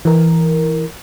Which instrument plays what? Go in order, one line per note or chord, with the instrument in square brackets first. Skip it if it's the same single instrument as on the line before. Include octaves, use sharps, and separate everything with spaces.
[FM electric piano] E3 A#4